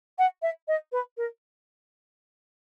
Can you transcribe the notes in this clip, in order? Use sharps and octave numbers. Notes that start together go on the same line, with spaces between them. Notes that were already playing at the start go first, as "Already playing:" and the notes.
F#5
E5
D#5
B4
A#4